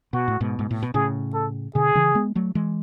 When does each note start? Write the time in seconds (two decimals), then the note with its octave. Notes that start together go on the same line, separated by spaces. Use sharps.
0.13 B2 F#4
0.28 A2
0.40 G#2 B2
0.59 G#2
0.71 A2
0.83 B2
0.94 A2 C#3 G#4
1.34 A4
1.75 B2 D3 G#4
1.95 C#3 E3
2.15 G#3 B3
2.35 F#3 A3
2.55 E3 G#3